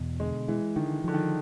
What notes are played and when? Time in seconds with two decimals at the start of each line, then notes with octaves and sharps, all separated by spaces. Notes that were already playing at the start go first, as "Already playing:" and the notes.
Already playing: E2 B2
0.20 D3 G#3
0.48 E3 G#3
0.76 D3 D#3
1.04 D3 F3
1.14 D#3